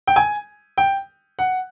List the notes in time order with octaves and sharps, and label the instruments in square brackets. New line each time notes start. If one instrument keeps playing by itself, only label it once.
[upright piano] G5
G#5
G5
F#5